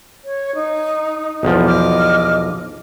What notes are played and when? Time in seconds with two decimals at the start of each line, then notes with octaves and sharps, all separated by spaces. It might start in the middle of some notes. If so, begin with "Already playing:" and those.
0.24 C#5
0.56 D#4
1.43 B1 E2 F3
1.65 D#5 D6 F6